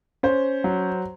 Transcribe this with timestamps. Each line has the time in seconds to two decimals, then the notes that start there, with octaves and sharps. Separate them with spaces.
0.23 C#4 C5
0.64 F#3